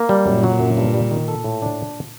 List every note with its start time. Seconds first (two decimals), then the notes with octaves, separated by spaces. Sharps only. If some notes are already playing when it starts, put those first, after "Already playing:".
Already playing: A#3
0.09 G3
0.26 F#2 A#2
0.44 F#3
0.59 F#2
0.77 G2
0.94 G3
1.11 D#3
1.28 A4
1.44 A2
1.62 D4